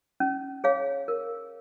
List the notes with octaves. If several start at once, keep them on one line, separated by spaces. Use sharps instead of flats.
C#4
G#4 C#5 F5
A#4